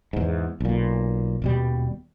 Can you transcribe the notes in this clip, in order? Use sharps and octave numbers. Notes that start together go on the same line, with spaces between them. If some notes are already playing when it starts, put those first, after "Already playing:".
E2 G#2
B1 A#2
D#1 B2 G3